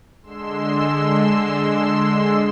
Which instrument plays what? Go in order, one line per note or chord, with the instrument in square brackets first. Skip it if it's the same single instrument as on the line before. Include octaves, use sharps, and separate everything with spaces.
[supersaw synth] D3 G#3 C6 E6 C7 E7